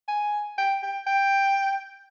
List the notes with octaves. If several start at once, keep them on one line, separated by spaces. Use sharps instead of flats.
G#5
G5
G5
G5